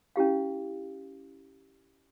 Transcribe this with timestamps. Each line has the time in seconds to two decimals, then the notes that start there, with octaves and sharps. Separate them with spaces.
0.16 C#4 E4 G4 F5